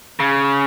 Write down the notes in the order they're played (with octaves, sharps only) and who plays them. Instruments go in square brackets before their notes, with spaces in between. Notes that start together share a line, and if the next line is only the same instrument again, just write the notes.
[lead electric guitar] C#3